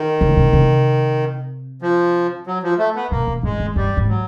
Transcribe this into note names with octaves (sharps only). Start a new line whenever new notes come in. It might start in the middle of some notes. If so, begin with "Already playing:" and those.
Already playing: D#3
C#3
C3
C3
F3
F#3
F3
A3
B3
B2 A#3
B2
A2 G#3
G#2
G2 G3
G#2
F#3